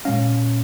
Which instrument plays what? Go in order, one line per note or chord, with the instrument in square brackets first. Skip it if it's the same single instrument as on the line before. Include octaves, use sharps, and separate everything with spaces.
[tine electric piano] A#2 G#3 C#4 F5